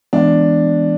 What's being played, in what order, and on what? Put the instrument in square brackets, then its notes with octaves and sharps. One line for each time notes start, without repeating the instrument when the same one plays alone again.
[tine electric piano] E3 G#3 B3 [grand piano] D4